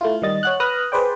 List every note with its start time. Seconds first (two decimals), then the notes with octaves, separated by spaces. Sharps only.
0.01 A3 E4 F4
0.22 D#3 G3 D#5 A6
0.43 C#5 F#5 F#6
0.60 B4 D#6 F6 F#6 A#6
0.92 G#4 B4 C5 D5 G5